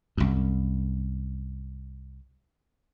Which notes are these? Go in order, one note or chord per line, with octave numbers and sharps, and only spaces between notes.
C2 F#2